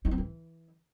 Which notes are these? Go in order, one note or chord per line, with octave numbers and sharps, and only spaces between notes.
D#4
C4
E3